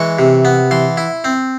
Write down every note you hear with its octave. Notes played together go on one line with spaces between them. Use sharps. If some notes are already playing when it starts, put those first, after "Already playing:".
Already playing: E3 G#3 C#6
C3
B3
E3 C6
E4
C4